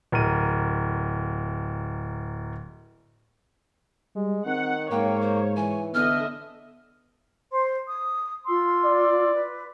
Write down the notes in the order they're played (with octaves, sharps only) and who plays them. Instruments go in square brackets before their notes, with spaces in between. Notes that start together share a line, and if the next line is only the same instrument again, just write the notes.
[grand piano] D1 A#4 D#7
[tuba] G3 [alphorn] G#3
[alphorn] D#3 [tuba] C4 [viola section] F#5
[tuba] G#2 [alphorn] A#3 [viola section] C#5 [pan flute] G5
[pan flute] C5
[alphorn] E3 [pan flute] G#5
[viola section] D3 D#5 E5 [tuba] B3 [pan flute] F6
[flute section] C5 C6
D#6
F4 C6 E6
[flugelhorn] D5
[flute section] B4